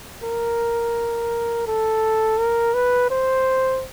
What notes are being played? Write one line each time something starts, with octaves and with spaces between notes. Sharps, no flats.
A#4
A4
A#4
B4
C5